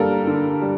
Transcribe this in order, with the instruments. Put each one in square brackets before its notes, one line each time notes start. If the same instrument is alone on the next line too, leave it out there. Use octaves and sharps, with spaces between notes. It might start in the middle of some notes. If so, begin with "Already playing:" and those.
Already playing: [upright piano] D3 G3 A#3 A4 A#4
D3
G3